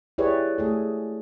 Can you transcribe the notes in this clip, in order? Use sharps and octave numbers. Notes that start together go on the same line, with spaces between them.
E4 G4 G#4 B4 C#5 D5
A3 G#4 A4